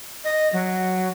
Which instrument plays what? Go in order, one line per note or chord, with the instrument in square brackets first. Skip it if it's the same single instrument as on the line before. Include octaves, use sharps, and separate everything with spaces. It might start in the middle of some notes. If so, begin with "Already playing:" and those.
[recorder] D#5
F#3